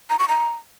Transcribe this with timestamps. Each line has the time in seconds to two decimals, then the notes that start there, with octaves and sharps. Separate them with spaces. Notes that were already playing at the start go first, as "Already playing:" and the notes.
0.10 A#5
0.19 C#6
0.29 A#5